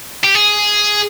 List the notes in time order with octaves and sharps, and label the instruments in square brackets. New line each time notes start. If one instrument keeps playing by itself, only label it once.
[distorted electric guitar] G4
G#4